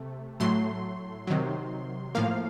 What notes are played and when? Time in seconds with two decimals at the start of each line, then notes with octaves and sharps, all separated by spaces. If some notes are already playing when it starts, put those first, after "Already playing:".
Already playing: C3 A3
0.40 A2 F#3 A3 C6
1.27 C3 D#3 F#3
2.15 A2 F3 A#3 F5